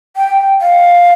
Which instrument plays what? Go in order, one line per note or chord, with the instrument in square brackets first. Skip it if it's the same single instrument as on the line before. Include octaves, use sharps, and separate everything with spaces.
[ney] G5
F5